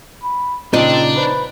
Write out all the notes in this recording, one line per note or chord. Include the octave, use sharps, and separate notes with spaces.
B5
A#2 C#3 F3 C4 D4 D#4
B4 C5 D5 B5